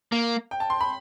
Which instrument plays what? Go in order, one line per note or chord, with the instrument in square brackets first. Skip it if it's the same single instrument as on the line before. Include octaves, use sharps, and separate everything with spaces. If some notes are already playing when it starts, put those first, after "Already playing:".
[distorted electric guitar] A#3
[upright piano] G5
A5
C6
B5